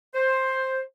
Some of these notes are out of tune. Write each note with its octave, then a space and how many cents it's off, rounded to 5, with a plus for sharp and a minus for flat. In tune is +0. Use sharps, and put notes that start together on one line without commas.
C5 +10